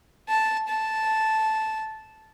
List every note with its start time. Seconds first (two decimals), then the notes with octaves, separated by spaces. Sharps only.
0.30 A5
0.69 A5